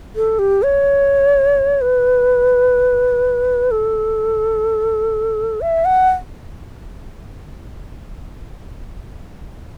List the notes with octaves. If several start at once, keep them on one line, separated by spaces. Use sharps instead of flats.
A4
G4
C#5
B4
A4
E5
F#5